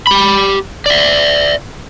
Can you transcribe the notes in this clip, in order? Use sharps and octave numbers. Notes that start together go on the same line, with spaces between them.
G4 B5
D5 E5